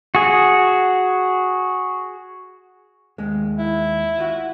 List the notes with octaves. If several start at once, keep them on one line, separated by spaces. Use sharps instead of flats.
F#4 G#4
D#2 G#3
E4
F4 F#4